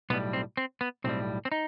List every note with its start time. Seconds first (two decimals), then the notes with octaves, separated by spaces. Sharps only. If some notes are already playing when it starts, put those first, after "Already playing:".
0.10 B1 A2 G3 B3
0.33 C4
0.57 C4
0.81 B3
1.04 B1 A2 G3 C4
1.45 C4
1.52 D#4